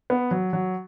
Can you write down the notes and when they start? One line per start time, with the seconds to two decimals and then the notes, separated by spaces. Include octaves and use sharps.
0.10 B3
0.31 F#3
0.53 F#3